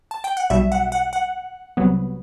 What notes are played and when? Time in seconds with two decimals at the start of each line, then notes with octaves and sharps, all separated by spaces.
0.11 A5
0.24 G5
0.37 F#5
0.50 B1 B2 G3 E5
0.72 F#5
0.92 F#5
1.13 F#5
1.77 C2 C3 F#3 B3